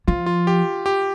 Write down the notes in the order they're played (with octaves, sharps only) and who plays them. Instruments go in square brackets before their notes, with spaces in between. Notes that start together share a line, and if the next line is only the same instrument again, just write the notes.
[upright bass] F3 [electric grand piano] F4
[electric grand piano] F4
G4
G4